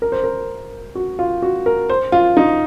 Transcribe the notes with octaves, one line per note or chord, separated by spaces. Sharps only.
A#4
C5
A#4
F#4
F4
F#4
A#4
C5
F4
D#4